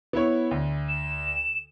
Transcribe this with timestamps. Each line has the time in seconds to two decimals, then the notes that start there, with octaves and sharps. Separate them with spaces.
0.13 B3 E4 C#5
0.51 D2
0.89 E7